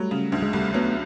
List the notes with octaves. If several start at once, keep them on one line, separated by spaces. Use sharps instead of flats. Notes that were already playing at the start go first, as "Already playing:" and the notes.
Already playing: F#3 G3 A3
C#3
D2
G#3
C2 G3 A3
F#3 A3 B3